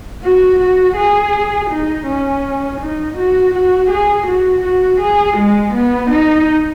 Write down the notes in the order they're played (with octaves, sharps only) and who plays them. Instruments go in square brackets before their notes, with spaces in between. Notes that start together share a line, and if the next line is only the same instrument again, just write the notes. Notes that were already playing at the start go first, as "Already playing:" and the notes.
[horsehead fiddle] F#4
F#4
G#4
D#4
C#4
D#4
F#4
F#4
G#4
F#4
F#4
G#4
G#3
B3
D#4